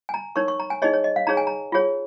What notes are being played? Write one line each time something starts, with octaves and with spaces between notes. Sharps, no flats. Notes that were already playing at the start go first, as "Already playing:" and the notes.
G#5
A#5
D#4 A#4 C#5 C#6
C#6
A#5
G#5
D#4 G#4 C#5 D#5
C#5
D#5
F5
D#4 G#4 C#5 A#5
G#5
A#5
F4 G#4 C#5